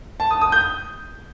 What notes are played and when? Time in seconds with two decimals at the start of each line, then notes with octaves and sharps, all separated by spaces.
0.20 A5
0.31 D#6
0.41 D#6
0.52 G6